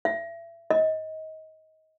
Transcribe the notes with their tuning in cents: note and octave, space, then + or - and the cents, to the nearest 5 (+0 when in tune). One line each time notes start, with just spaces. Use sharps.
E5 +30
D#5 +25